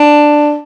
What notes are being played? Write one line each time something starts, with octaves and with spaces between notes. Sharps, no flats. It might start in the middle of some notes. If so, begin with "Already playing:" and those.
Already playing: D4